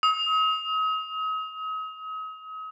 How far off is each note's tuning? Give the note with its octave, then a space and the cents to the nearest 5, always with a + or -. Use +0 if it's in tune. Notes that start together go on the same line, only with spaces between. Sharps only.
D#6 +40